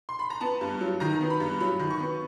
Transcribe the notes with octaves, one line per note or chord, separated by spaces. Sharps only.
C6
B5
A#5
B3 A5
G2
F#3
D#3 A#5
B3
B5
G2
F#3 B5
D#3
C#6
B3